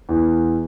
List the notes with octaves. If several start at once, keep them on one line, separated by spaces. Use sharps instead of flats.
E2